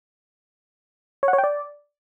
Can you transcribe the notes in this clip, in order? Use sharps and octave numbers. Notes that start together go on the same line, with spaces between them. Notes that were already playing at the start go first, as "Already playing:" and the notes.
C#5
F#5
C#5
G5
D5